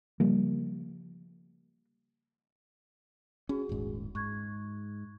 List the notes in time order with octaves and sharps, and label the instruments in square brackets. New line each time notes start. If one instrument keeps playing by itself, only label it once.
[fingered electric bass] C#3 F3 G3 A#3
[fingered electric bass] C#4 [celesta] F#4 G#4
[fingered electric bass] D#1 G#1 G#2
[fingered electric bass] G#2 [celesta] C#6 F#6 G#6